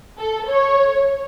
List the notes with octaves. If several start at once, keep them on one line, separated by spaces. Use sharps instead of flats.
A4
C#5